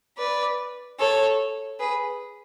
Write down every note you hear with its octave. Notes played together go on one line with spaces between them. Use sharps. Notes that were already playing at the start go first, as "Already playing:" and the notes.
B4 D5
A4 C#5
G#4 B4